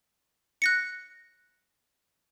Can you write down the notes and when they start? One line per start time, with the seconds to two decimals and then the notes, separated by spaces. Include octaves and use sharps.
0.62 F#6 A#6 C#7